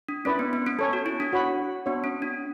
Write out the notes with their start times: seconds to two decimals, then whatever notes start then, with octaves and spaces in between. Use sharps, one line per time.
0.08 D4
0.25 C#4 E4 B4 D5
0.39 B3
0.53 B3
0.66 C#4
0.79 B3 A4 C#5 G#5
0.93 F#4
1.06 E4
1.20 D4
1.33 F#4 C#5 F#5 B5
1.86 B3 D4 F#4 C#5 E5
2.04 C#4
2.22 D4